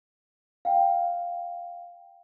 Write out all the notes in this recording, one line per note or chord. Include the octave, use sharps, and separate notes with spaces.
F5 G5